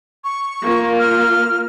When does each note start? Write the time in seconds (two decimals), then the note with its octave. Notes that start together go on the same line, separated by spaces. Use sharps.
0.24 C#6
0.63 A#3 F4
0.99 F6